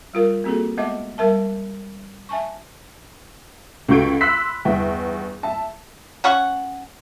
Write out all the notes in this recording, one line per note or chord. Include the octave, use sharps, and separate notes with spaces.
G3 F4 A#4
A#3 C4 F#4 G#4 A4
G#3 B3 D#5 E5 D6
G3 A#4 E5 A5
E5 G#5 A5 C#6
C#2 F#4 A4 C#6 G6 D7
B5 C6 E6 F#6 B6
G1 E2 E5 G5
E5 A5
C#4 F#5 C#6